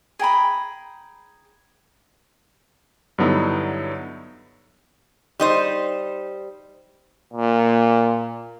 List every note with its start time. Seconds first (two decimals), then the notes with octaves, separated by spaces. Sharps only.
0.19 G#4 G5 A#5 B5
3.18 G2 D3 F#3 B3 D#4 E4
5.40 G3 D#4 C5
7.33 A#2